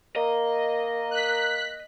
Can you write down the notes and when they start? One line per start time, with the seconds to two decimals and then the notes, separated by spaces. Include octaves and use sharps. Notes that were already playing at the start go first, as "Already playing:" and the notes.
0.16 A#3 A#4 D#5
1.11 F#6 B6